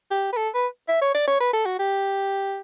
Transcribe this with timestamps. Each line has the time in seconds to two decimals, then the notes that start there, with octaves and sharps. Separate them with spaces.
0.11 G4
0.33 B4
0.37 A4
0.54 B4
0.88 E5
1.02 C#5
1.14 D5
1.27 C#5
1.40 B4
1.53 A4
1.66 F#4
1.79 G4